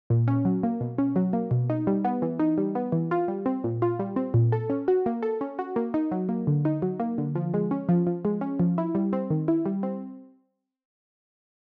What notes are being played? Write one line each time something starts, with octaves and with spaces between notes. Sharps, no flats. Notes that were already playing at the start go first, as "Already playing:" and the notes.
A#2
C#4
F#3
A#3
B2
C#4
F#3
A#3
B2
D#4
G3
B3
E3
D#4
G3
B3
E3
F4
G3
C4
A#2
F4
G3
C4
A#2
A4
C#4
F#4
A#3
A4
C#4
F#4
A#3
D#4
F#3
A#3
D3
D#4
F#3
A#3
D3
F3
G#3
C#4
F3
F3
G#3
C#4
F3
E4
G3
C4
D#3
E4
G3
C4